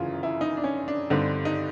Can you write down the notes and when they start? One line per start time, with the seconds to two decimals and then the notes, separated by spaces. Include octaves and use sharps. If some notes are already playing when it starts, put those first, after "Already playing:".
Already playing: G1 F#2 C#3 E3 F4
0.23 E4
0.41 D#4
0.57 D4
0.64 C#4
0.88 D4
1.10 G2 D3 G3 C4 D#4
1.45 D#4